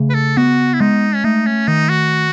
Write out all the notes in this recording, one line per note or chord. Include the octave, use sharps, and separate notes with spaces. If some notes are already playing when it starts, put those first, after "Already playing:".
Already playing: C#3 A3
B4
A4
B3 F#4
E4
G#3 D#4
C#4
A3 D#4
C#4
D#3 D#4
F#4